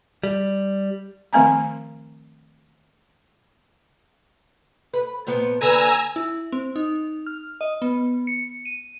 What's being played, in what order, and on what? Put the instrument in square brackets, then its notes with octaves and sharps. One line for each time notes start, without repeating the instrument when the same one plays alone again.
[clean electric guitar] G3
[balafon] D#3 F3 A3 C4 G#5 A#5
[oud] B4
A#2 F3 B3
[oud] D3 A#3 B4 [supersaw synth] G#5 A#5 E6
[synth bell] E4
C4
D#4
F6
D#5
B3
C#7
D#7